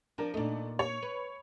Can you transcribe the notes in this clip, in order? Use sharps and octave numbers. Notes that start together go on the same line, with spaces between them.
F3 D4 A#4
A#2 A3 D4 D#4
C#5
B4